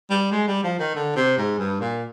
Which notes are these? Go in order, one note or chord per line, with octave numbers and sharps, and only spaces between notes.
G3
G#3
G3
F3
D#3
D3
C3
G#2
G2
A#2